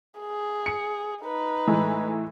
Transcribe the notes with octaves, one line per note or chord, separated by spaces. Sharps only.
G#4
C#7
D#4 B4
A2 E3 G#3